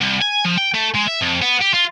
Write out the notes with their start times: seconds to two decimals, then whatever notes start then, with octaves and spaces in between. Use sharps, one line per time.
0.02 C2
0.22 G#5
0.45 F3
0.58 G5
0.74 A3
0.94 G#3
1.07 E5
1.21 F2
1.42 B3
1.61 G4
1.74 F4